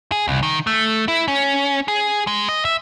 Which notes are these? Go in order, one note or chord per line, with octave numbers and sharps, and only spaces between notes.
G#4
C2
D#3
A3
E4
C#4
G#4
G#3
D#5
E5